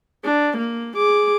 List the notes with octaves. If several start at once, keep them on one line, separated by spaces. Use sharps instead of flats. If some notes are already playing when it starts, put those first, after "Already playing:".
D4
A#3
G#4 D6